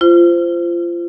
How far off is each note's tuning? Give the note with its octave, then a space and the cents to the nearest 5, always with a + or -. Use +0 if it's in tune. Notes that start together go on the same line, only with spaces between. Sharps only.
F4 -25 C5 -15